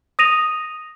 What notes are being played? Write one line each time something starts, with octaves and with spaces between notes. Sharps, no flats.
D#6 A#6 D#7 F7